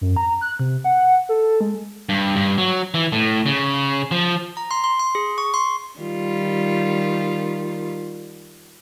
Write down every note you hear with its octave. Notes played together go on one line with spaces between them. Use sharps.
F#2
A#5
F#6
C3
F#5
A4
G#3
G2
G2
F#3
E3
A2
C#3
F3
A#5
C6
C6
C6
G#4
C#6
C6
D#3 G3 F4